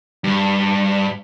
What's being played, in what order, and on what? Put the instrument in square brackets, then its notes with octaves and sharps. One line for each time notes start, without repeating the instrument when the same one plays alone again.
[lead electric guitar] G2